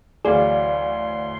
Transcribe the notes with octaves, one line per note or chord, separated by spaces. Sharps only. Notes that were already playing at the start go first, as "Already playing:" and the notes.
D2 E3 F#3 G#4 D5 F5 C6